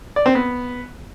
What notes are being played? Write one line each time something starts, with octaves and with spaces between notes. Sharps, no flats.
D5
C4
B3